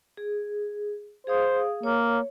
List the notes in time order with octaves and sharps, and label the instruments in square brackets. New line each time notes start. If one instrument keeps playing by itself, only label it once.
[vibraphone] G#4
[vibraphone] G#4 F5 D#6 [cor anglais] C5
[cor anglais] A#3 [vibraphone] C#5